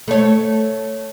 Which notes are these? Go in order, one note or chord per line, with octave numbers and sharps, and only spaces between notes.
A3 C#5